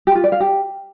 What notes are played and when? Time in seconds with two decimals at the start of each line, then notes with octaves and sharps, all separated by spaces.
0.07 G4
0.15 F4
0.24 D5
0.32 F5
0.40 G4